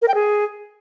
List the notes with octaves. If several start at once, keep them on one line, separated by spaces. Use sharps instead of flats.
A#4
G5
G#4